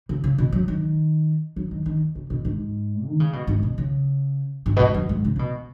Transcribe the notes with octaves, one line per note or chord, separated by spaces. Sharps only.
C#3
C#3
B2
F#3
D#3
F#3
D#3
D#3
C#3
B2
G#2
D#3
C#3
B2
G#2
B2
C#3
G#2
B2
G#2
F#2
G#2
C#3
C#3
B2